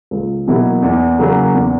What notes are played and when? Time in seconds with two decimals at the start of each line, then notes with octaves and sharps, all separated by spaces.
0.11 C#2
0.47 B2 F#3 A#3 E4
0.82 E2
1.18 C#3 F#3 A#3 C#4
1.54 E2